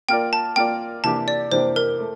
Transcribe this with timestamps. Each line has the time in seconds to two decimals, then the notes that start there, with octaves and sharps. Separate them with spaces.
0.09 A#3 F4 A#4 D5 G5
0.33 A5
0.56 A#3 F4 A#4 D5 G5
1.04 C3 E3 A#3 D4 G4 A5
1.28 D5
1.52 C3 E3 A#3 D4 G4 C5
1.76 A#4
2.00 A3